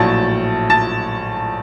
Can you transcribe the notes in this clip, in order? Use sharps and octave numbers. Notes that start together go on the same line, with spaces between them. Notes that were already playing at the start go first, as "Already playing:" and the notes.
Already playing: A#1 A2 F#3 A3 A5 A6
A5 A6